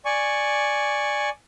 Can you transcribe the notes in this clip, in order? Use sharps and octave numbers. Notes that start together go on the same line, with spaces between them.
D5 G#5 C#6